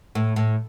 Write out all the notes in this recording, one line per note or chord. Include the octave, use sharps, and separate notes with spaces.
A2
A2